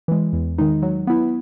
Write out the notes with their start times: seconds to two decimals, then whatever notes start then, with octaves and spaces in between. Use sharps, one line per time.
0.08 E3 G#3
0.33 E2
0.58 D#3 G#3 D#4
0.82 F#3
1.07 B3 E4